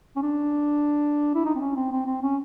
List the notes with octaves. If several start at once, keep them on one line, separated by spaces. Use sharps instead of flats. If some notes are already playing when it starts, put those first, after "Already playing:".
C#4
D4
E4
D#4
C4
C#4
C4
C4
C4
C#4